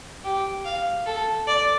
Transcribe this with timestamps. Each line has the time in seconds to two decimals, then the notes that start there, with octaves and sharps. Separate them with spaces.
0.24 G4
0.65 F5
1.06 A4
1.47 D5